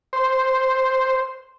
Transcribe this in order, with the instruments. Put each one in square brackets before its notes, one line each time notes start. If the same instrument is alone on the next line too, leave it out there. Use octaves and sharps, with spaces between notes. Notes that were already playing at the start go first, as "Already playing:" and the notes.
[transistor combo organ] C5